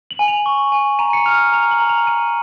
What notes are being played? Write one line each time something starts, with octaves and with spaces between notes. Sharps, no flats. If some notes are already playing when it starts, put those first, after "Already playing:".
F#7
G#5
F7
C#6
G#5
A#5 D#7
C#7
F6 F7
A#5 F7
F#7
A#5
F7
F6 D#7